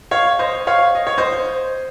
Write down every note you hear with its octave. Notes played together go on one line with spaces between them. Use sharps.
C#5 F5
C5 D#5
C#5 F5
D#5
C#5
C5 D#5